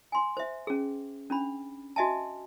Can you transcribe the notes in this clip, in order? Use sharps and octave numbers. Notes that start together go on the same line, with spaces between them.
G#5 C6
C5 E5
C#4 G#4
C#4 D4 B5
F#4 D#5 E5 G#5 A5